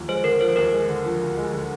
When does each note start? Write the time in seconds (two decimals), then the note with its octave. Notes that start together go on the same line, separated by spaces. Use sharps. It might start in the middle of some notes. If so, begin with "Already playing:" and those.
Already playing: D#2 D3 F3
0.08 G#3 C5
0.24 D3 A#4
0.40 F3 C5
0.56 D#2 A#4
0.72 G#3
0.88 D3
1.05 F3
1.21 D2
1.37 G#3
1.53 D3